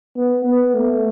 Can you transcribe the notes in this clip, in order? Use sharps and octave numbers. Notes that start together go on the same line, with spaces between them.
B3
B3
A3